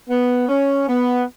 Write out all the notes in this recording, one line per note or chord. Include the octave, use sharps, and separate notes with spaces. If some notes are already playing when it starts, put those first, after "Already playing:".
B3
C#4
B3